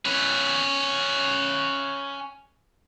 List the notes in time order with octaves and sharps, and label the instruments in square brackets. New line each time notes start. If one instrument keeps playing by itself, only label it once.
[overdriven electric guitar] C#4 B4